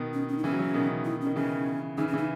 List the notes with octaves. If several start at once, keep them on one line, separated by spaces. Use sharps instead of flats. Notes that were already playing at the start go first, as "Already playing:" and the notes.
Already playing: B2 D#3
C#4
C#4
D#4
C#3 E3 C#4
F#3
C#3 E3
B2 D#3
E4
C#4
D#3
C#3 E3 C#4
C#3 E3 D#4
C#4
C#3 E3 D#4